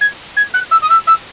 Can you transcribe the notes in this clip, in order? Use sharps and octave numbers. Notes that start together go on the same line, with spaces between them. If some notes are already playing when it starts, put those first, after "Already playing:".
G#6
G#6
F#6
E6
D#6
E6
E6